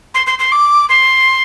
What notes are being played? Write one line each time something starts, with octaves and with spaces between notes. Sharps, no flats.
C6
C6
C6
D6
C6